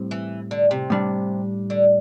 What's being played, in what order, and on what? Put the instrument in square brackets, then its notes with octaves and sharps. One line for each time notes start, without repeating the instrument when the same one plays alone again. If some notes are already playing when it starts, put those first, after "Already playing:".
Already playing: [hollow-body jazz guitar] A2 G3 C4
[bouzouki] E3
D3
C3
[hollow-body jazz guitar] A2 G3 D4
[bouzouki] D3